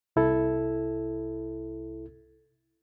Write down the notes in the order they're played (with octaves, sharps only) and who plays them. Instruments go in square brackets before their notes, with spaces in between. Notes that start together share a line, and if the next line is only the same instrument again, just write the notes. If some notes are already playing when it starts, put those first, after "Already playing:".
[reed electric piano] C2 E4 A4